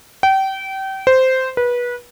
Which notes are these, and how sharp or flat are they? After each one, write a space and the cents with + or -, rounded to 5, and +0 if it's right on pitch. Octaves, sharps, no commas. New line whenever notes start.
G5 -30
C5 -10
B4 -25